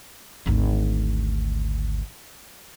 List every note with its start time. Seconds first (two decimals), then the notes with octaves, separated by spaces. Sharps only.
0.46 G#1 D2